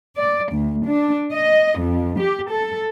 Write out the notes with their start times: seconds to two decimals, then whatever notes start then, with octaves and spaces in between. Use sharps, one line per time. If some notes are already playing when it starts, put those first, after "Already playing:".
0.17 D5
0.53 D2
0.86 D4
1.34 D#5
1.81 F2
2.20 G4
2.51 A4